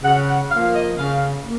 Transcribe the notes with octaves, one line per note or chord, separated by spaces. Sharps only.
C#3 F#5
F#5
F3 A#3 F5
D#5
C#3 F5
A#3